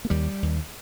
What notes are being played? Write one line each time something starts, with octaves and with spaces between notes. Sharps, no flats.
A#3
D#2 G3
D#2